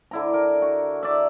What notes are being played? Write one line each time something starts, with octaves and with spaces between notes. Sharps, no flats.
D3 E4 A#5
A#4
F#4
D5 E5